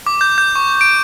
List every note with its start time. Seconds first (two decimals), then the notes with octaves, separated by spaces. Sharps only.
0.07 D6
0.21 G6
0.38 G6
0.56 C#6
0.81 D7